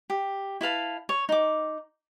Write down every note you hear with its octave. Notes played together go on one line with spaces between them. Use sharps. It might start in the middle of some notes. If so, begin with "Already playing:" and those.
G4
E4 B4 F5 A5
C#5
D#4 D6